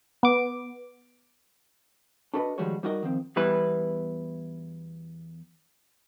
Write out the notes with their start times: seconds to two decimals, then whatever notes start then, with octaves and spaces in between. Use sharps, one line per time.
0.23 B3 D6
2.33 D4 F#4 A4 B4 D#5
2.58 D#3 F3 G3 G#3 F#4 C#5
2.83 G3 D#4 F4 F#4 A#4 D#5
3.03 D#3 F3 C4
3.36 E2 G3 B3 E4 B4